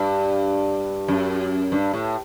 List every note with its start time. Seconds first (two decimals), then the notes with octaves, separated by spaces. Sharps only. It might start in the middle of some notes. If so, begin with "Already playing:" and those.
Already playing: G2
1.08 F#2
1.72 G2
1.94 A2